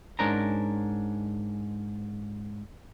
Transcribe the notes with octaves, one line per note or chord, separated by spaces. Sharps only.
G#2 C#4 D4 A#4 C5 A#5